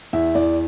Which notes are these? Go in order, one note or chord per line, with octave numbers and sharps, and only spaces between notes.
E2 E5
E2 D5